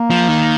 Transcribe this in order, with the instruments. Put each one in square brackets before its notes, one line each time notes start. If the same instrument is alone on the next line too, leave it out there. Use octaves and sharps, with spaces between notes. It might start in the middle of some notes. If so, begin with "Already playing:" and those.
Already playing: [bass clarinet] A#3
[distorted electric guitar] F3
D#3